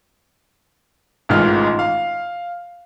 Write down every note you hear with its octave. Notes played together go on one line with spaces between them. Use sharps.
A1 G#2 D#3 F4 F6
F5